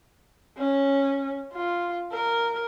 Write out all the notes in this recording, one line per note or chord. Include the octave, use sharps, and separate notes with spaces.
C#4
F4
A#4